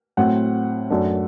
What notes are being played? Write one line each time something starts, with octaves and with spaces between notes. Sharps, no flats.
A2 F#3 C4 F#5
F#2 F#3 A3 D4